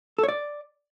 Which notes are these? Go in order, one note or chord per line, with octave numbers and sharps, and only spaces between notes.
A4
C#5
D5